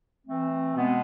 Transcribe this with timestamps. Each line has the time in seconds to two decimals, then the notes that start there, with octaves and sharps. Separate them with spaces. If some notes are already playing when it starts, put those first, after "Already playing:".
0.26 E3 A3 C4
0.73 B2 G#3 B3